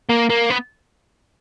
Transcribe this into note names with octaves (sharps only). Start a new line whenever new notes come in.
A#3
A#3
B3